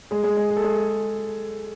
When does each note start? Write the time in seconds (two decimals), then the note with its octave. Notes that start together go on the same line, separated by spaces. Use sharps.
0.11 G#3 G#4
0.23 G#3 G#4
0.37 G#3 G#4
0.50 G#4
0.57 A4
0.64 G#3 G#4